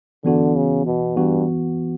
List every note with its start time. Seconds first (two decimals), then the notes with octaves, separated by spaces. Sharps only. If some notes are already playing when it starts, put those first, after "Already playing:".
0.25 D3 E3 B3 F#4
0.56 C#3
0.86 B2
1.17 G2 E3 B3 F#4